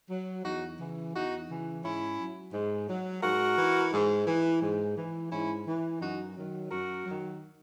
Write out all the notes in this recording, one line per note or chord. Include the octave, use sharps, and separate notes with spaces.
F#3
E2 D#4 F#4
C#3 E3
E2 D#4 F#4
C#3 E3
G#2 C#4 E4
F#3
G#2
F#3
G#2 F#4 A#4
E3
G#2
E3
G#2
E3
G#2 C#4 E4
E3
F#2 D#4 F#4
D#3 F#3
F#2 F#4 A#4
D#3 F#3